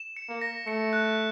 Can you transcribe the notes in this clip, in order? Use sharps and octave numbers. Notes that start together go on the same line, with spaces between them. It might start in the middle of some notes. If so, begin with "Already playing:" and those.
Already playing: E7
C#7
A#3
A#6
A3 C#7
F#6